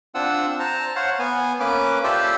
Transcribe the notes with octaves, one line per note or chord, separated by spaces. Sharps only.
C4 D4 F4 F#5 E6
C5 A5 A#5
C5 C#5 F5 F#5
B3 G#5
A#3 C#4 B4 D6
F4 G4 A4 C5 D5 E5